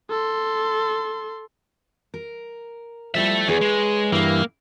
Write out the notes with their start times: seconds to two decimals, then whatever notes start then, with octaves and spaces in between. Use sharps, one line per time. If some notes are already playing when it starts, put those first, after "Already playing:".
0.10 A4 C6
2.14 A#4
3.14 F3 G3 E4 A4 E5
3.48 E2 G#4 B4 C#5
3.61 G#3
4.12 G2 E3 A#3